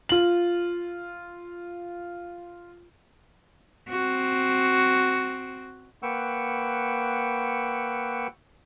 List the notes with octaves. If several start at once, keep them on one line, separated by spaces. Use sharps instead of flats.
F4 F#7
C4 F#4
A#3 B4 F#5 G5 C#6 E6